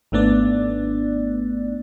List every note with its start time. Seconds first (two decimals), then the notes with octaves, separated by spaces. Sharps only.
0.12 G#1 A3 B3 D4 D5